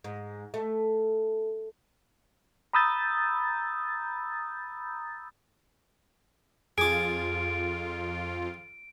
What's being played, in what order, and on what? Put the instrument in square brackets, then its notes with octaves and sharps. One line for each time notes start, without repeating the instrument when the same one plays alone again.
[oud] G#2
A3
[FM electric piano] A#5 B5 D#6 E6 G6 A6
[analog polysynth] F2 F4 [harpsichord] G#4 D6 [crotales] D7